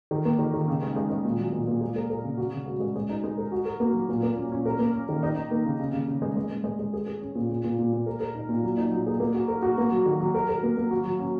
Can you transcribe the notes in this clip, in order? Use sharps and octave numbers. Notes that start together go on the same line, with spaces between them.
D#3
A#3
D#3
D#3
C#3
G#3
G#3
G#3
A#2
F#3
A#2
A#2
G#3
A#4
A#4
C#3
F#4
C#3
G#3
G#3
G#3
D#4
G#3
A#4
F#4
A#4
A#3
F#3
A#2
A#3
C#4
C#4
A#4
A#3
C#4
D#3
D#4
D#4
A#3
C#3
C#3
C#3
C#3
G#3
G#3
G#3
G#3
G#3
G#4
G#4
C#4
A#2
A#2
A#2
A#2
A#2
A#4
A#4
D#4
A#2
F#3
D#4
F#3
G#4
A#3
F#4
A#4
F#4
A#3
F#3
D#3
F#3
A#4
A#4
A#3
A#3
F#4
F#3
C#4